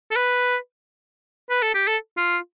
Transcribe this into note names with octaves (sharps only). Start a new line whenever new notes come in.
A4
B4
B4
A4
G4
A4
F4